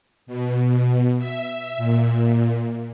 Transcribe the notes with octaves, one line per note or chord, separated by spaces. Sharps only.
B2
E5
A#2